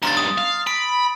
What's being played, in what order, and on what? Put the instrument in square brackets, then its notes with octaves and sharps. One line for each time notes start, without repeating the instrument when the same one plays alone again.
[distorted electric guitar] B1 G2 [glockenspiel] A#5 C6 A6
[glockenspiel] D#6
[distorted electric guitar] F5
[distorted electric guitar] B5 [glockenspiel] D7